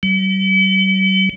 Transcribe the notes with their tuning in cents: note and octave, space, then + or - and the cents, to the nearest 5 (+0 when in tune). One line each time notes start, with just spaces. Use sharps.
G3 -45